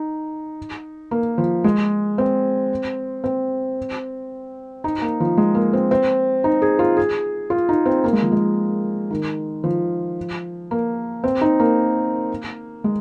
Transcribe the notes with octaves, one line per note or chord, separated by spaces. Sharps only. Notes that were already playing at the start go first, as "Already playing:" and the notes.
Already playing: D#4
A#3
F3
G#3
C4
C4
D#4
A#3
F3
G#3
A#3
C4
C4
D#4
G#4
F4
G#4
F4
D#4
C4
A#3
G#3
F3
G#3
D#3
F3
A#3
C4
D#4
A#3
G#3